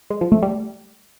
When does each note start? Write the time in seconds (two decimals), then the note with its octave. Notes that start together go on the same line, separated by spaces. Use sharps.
0.10 G#3
0.21 F3
0.32 A3
0.42 G3